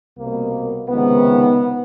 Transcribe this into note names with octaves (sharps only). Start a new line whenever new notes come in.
C2 B2 A#3
C#2 C3 D#3 B3